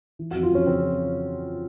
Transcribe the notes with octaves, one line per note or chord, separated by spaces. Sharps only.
E3
F2 F#4
F4
F2 C#4
C#3 C4